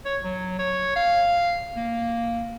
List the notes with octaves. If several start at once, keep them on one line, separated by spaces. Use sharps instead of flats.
C#5
F#3
C#5
F5
A#3